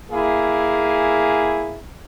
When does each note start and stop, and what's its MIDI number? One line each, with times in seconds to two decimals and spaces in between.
0.12 1.79 58
0.12 1.79 64
0.12 1.79 68